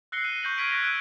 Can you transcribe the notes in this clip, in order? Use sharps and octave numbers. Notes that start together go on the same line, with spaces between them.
E6 F#6 A#6 C7 C#7 G7
D#7
C#6 G6 A#6 F#7
F6 G6 G#6 B6 D7 F#7
C#6 F#6 G#6 A#6 B6 F7
E6 D7